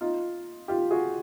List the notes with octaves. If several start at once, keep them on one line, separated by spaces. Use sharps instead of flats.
D#4 F4
F4 G4
F#4 G#4